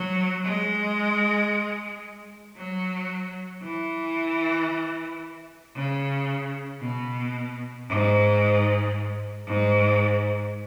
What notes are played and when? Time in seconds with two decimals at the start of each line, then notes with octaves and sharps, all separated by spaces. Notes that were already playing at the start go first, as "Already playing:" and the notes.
Already playing: F#3
0.44 G#3
2.57 F#3
3.64 E3
5.76 C#3
6.81 B2
7.89 G#2
9.47 G#2